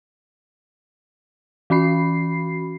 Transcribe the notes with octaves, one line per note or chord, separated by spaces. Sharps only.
E3 C#4 F#4 B5 C7